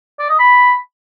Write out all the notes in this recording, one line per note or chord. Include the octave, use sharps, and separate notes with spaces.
D5
D#5
B5